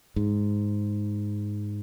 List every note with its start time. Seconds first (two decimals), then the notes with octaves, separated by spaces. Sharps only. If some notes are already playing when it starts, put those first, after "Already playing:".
0.16 G#2